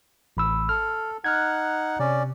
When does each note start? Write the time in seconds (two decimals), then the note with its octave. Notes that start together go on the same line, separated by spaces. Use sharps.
0.37 A1 B5 E6
0.69 A4 F6
1.24 D#4 F#5 F6 F#6 G#6
2.00 C3 C#4 D5